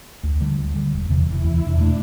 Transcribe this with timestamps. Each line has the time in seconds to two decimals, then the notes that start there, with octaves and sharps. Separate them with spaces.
0.23 D2
0.41 D3 G3
0.58 D2
0.75 D3 G3
0.92 E1
1.09 E2 C3 E3
1.27 E1 E4
1.44 E2 C3 E3
1.61 E2 D4
1.78 B2 A3